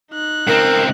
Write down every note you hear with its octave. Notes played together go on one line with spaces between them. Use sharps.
D#4 F#6
C#2 C4 A#4